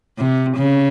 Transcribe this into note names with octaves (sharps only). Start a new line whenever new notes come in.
C3
C#3